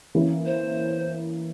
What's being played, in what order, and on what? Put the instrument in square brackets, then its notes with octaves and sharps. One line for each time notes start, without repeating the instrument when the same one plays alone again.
[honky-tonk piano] E3 A#3 C#4 E4
[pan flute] C5